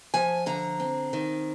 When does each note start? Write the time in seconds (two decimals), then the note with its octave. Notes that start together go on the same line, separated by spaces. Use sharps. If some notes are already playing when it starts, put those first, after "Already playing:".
0.14 F3 G#5
0.46 D3 A#5
0.80 C4
1.13 D#3